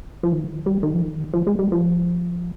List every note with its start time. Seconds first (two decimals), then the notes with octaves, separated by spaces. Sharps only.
0.23 F3
0.32 D#3
0.66 G3
0.83 D#3
0.94 F3
1.02 D#3
1.34 F3
1.47 G#3
1.59 G3
1.72 F3